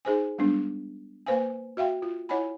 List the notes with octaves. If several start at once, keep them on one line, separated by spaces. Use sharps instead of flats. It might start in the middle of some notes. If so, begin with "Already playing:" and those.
D#4 G#4 C5 G#5
G3 G#3 B3 D4
A#3 B4 C5 F5 G#5
F#4 E5 F5 G5
F4
E4 C#5 D#5 F#5 G#5 B5